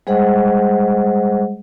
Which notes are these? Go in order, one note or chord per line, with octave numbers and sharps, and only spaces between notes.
G3 G#3 G#4 C5 D#5 F#5